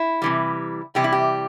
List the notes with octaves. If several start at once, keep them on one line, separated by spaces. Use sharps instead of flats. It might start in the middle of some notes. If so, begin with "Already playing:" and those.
Already playing: E4
C3 E3 G3
C3 E3 G3 G4
E4
G4